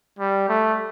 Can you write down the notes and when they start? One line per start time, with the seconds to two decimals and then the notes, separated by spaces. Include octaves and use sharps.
0.19 G3
0.49 A3